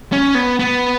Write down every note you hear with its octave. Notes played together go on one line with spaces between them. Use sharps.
C#4
B3
B3